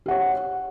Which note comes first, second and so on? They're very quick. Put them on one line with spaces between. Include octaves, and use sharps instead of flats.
G4 F#5 C#5